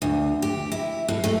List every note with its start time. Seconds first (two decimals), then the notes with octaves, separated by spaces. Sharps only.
0.02 D2
0.42 G4
0.72 E4
1.08 A2
1.24 A3